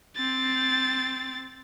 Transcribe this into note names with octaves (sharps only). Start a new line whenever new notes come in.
C4 A6